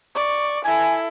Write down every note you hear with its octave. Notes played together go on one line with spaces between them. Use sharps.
D5 C#6
E4 A4 G#5